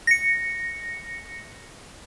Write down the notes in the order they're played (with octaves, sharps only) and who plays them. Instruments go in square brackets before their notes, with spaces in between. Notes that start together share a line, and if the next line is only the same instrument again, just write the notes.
[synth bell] A#6 C#7